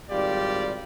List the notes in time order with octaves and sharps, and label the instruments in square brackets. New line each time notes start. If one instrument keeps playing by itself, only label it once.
[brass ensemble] G#1 G3 F4 G4 D5